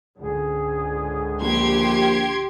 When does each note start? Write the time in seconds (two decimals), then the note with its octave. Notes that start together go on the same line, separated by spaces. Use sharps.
0.18 C#2 G#2 D3 G#4
1.41 A#1 G4 C6 G#6